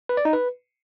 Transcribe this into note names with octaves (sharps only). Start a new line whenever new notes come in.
B4
D5
D#4
B4